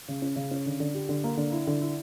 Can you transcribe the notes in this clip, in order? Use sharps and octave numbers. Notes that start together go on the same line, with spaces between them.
C#3
C#4
C#3
C#4
D3
D3
G4
D3
A#3
D3
E4
D3
E4